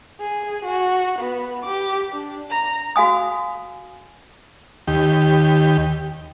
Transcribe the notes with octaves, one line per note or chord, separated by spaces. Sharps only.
G#4
F#4
B3
G4 D6
D4
A#5
F#4 F5 G#5 D#6
D#2 G4